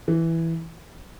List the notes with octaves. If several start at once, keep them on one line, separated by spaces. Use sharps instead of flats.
E3